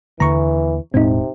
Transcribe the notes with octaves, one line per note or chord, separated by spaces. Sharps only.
D#2 D3 E3 A#3 A#5 C#6
E1 A2 C3 G#3 C4 D#4